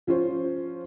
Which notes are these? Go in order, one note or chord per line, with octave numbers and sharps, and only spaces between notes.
F3 C#4 F4 C5